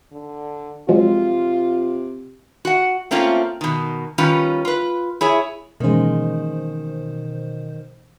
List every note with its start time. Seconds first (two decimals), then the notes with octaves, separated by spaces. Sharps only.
0.13 D3
0.89 C3 F3 F#3 G#3 F4
2.65 F#4 F#5
3.11 A3 A#3 C4 C#4 F4
3.61 B2 D#3
4.18 D#3 G3 C#4 F4 B4
4.65 F4 B4
5.21 E4 G#4 C#5
5.80 B2 D#3 E3 G#3 A#3 C#4 C5